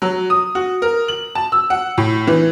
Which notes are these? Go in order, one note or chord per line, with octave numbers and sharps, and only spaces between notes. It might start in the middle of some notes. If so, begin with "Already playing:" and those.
F#3
D#6
F#4
A#4
F#7
A5
E6
F#5
A2
E3